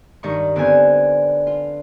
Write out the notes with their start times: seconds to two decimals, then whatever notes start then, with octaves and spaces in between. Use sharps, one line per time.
0.23 G2 D#3 C#6
0.56 D3 B3 C4 D4 G#5
1.47 F4